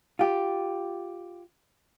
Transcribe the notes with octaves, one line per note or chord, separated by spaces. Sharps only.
F4 G4